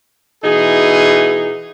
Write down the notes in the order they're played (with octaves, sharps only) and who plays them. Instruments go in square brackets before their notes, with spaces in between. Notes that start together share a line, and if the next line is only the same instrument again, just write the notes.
[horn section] B2 E3 D#4 G#4